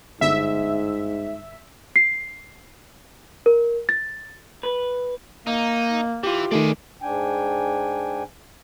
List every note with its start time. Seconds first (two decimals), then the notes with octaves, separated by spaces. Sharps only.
0.21 G1 G#2 E5
1.96 C7
3.46 A#4
3.89 A6
4.63 B4
5.47 A#3 D#4
6.23 E3 F4 G4
6.52 D#3 A3 G#4 D5
7.02 G#2 D4 G5 G#5